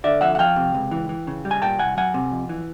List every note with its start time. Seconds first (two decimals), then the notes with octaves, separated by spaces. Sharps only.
0.04 D3 D5 E5
0.21 F2 E5 F#5
0.35 F#5
0.39 F3 F5 G5
0.56 C3
0.75 C#2
0.91 E3
1.09 E3
1.27 C#3
1.45 G3
1.51 G#5
1.62 A#2 G5 A5
1.79 C2 F#5 G#5
1.97 F#3 F#5 G#5
2.14 C3
2.32 F2
2.49 E3